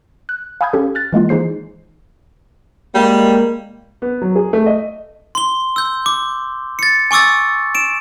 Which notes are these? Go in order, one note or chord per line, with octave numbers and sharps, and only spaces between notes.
F#6
F5 G#5 B5 D#6 G6 G#6
C#4 G4 A4
F6 F#6 A6
E3 G#3 A#3 F4
E3 D#4 G#4 C5 C7
G3 G#3 A#3
B3
F#3
G#4
A3
D#5
C6 G7
E6 G6
D6
A6 C#7
G#5 C#6 D6 E6 A6
D7 E7